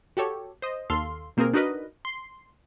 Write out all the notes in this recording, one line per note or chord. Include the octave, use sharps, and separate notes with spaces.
F#4 G4 A4 C#5
C5 D#5
D#2 A4 F5 C6
B2 A#3 C4 F4 G#4 A#4
D4 D#4 F#4 A#4 B4 D#5
C6